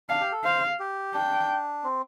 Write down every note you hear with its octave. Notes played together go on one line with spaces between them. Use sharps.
D4 F5
G4
A4
C5 F5
G4
D4 G5
C4